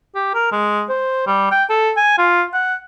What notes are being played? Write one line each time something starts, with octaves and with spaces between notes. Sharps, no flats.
G4
A#4
G#3
C5
G3
G5
A4
G#5
F4
F#5